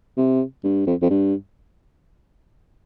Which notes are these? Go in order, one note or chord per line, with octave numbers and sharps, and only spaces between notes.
C3
G2
F2
F2
G2